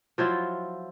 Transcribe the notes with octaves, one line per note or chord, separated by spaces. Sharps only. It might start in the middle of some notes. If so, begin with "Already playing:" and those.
F3 F#3 E4 F4